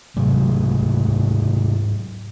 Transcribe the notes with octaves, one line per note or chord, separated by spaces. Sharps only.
G#2 C3 F#3 A3